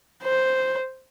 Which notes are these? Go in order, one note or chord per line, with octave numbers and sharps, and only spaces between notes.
C5